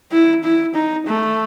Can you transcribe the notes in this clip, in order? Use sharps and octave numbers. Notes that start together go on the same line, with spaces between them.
E4
E4
D#4
A3